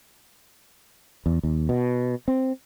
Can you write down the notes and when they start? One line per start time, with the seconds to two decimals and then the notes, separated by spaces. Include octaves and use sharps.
1.26 E2
1.43 D#2
1.69 B2
2.28 C4